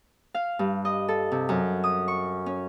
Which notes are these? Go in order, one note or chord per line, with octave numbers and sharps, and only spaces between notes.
F5
G2
D#5
A4
C3
F#2
D#6
C#6
C#4